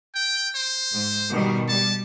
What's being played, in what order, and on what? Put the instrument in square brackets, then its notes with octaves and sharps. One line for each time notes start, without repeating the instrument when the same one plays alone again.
[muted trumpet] G5
C5
[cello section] G#2
B2 D#3 G3
[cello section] G3 [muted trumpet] A5